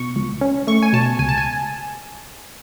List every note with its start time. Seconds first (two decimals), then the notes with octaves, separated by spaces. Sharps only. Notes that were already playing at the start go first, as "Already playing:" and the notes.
Already playing: B2 C#6
0.16 C#2
0.41 C#4
0.67 A3 C#6
0.83 G#5
0.93 B2 A5
1.19 C#2 G#5
1.29 A5
1.38 G#5